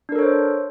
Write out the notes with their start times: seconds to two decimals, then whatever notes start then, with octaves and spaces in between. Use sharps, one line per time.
0.09 D4
0.12 A#4
0.16 A4
0.19 C#5
0.22 C5